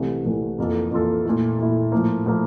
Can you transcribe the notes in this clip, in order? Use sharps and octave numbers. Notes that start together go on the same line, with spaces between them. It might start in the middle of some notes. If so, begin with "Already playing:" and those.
Already playing: C2 C3 E3 A3
C2 C3 E3 A3
F2 E3 A#3 F4 A4
F2 E3 A#3 F4 A4
A#2 A3 E4
A#2 A3 E4
A2 F3 A#3
A2 F3 A#3